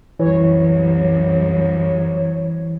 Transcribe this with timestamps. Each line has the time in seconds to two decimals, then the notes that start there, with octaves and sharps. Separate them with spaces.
0.19 C2 F#2 E3 C#5